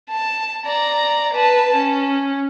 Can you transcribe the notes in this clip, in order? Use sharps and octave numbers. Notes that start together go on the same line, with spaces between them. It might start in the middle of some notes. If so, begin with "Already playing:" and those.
A5
D5 A#5
B4 A5
C#4